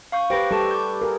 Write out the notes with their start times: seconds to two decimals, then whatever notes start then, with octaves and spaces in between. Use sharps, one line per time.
0.12 F5 C#6 G6
0.30 G4 B4 C5 G5 A#6
0.51 G3 G4 A4 B4 A5 C#6
0.71 D6 G6
1.02 G#4 A#4